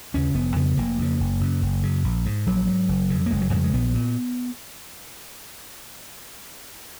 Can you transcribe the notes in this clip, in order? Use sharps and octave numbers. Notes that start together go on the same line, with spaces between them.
D#2 C#3 C#4
F1 B3
F2 C#3 B3
F1 A#3
F2 C#3
F#1
F#2 C#3
F#1
F#2 C#3
A#1
G#2
A#1 F#3
G#2
F#1
F2 C#3
A#3
F#1 G#3
F#3
F2 C#3 G#3
G#3
A#1 B3
A#2